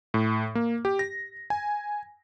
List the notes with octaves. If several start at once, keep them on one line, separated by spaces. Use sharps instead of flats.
A2
A#3
G4
A#6
G#5